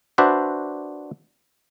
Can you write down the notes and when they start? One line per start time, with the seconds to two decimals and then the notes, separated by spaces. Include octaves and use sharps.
0.18 D4 F#4 B4 C5 D5 E5